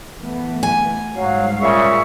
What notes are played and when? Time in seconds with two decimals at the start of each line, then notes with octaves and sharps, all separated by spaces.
0.19 E3 A3 B3
0.63 G#5
1.15 G#2 F#3 G3 F5
1.61 A#2 C#3 E5 C#6